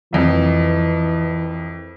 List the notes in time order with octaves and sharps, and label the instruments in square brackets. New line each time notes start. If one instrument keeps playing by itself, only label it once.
[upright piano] C2 F2 [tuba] E3